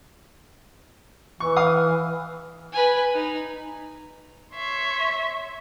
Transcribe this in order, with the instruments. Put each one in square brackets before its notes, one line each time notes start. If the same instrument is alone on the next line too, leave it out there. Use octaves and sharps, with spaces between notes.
[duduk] E3 [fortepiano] C#6
[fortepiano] F5 D#6
[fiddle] B4 G#5
D#4
[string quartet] C#5 E5 C6